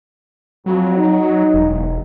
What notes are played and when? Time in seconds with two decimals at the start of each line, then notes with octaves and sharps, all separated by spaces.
0.66 F2 F#3
0.97 D#4
1.54 E1